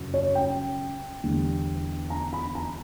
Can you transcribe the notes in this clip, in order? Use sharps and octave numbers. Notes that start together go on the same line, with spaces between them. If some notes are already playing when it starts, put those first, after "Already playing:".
Already playing: F#2 C#3 F#3
C#5
G5
E2 D3 G3
A#5
B5
A#5